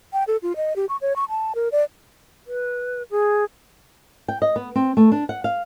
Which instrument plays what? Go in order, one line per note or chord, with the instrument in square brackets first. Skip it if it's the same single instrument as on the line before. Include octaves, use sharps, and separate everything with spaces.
[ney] G5
A4
F4
D#5
G4
C#6
C#5
C#6
A5
A#4
D5
[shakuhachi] B4
G#4
[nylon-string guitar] G5
D#5
B3
C4
A3
D4
F#5
F5